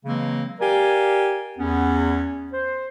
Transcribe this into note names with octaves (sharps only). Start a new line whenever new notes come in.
C#3 E3 F#3 G#3 A#3 C4
G4 A#4 D5 F5 G#5
E2 B3 C#4
C5